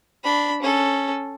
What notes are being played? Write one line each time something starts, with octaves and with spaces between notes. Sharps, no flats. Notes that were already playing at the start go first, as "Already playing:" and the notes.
D4 B5
C#4 A4